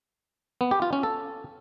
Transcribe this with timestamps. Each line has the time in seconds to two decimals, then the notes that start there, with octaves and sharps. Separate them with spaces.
0.61 B3
0.71 G4
0.82 F4
0.93 C#4
1.03 A4